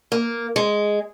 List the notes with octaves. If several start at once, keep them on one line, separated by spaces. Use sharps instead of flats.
A#3
G#3